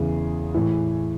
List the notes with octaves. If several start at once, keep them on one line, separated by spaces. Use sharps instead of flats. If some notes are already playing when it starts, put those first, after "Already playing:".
Already playing: E2 C#3 E3 G#4
A2 E3